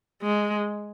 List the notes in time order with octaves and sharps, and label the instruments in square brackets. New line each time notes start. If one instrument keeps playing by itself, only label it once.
[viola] G#3